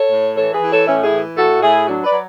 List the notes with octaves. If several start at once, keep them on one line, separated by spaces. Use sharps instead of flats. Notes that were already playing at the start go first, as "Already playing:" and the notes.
Already playing: A4 C#5
A2
E3 A4 C#5
G#4 B4
E3
A4 C#5
A2 C#4 E4
E4 G#4
E3
A2 F#4 A4
A2 E4 G#4
F#3 D4 F#4
B4 D5
F#3